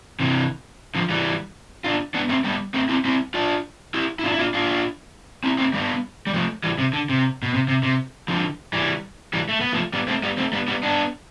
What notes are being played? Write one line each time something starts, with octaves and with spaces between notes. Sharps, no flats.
C3 E3
D3 F3
E3 G3
D4 F4
B3 D4
A3 C4
G3 B3
A3 C4
C4 E4
C4 E4
D4 F4
E4 G4
E4
D4 F4
E4
D4 F4
D4 F4
C4 E4
A3 C4
G3 B3
G3
F3 A3
E3 G3
C3
D3
C3
B2
C3
C3
C3
D3 F3
E3 G3
E3 G3
A3
B3
F3 A3
G3 B3
A3 C4
G3 B3
A3 C4
G3 B3
G3 B3
B3 D4